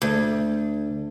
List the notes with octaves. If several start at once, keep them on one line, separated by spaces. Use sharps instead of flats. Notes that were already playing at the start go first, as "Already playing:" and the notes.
D2